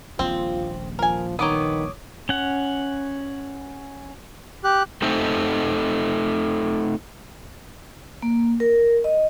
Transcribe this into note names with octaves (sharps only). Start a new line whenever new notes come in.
D#1 A#1 C4 F4
F3 A#4 G#5
D#3 B3 D#4 C#5 D6 D#6
C#4 F#5
G4 F#6
A3 C4 D#4 A4 C5 D#5
A#3
A#4
D#5